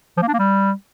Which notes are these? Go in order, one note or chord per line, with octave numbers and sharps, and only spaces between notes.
F3
A#3
D4
A#3
G3